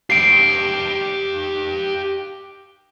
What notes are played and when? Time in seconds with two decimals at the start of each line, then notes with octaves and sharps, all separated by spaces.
0.10 G4 F5 C7 D7